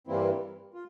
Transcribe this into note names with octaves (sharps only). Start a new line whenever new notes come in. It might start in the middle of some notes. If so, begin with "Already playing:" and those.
G2 E3 G3 A#3 C4 E4
F4